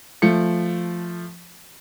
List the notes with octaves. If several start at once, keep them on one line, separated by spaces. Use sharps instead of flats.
F3 A3 C#7